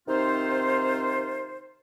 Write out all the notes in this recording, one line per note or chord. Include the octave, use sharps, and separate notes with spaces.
C3 D#3 C4 D#4 F4 C5